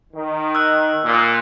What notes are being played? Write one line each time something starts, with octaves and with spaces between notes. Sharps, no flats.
D#3
E6 F#6
A#2